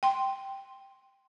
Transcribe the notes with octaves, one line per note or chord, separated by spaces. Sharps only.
G5 C6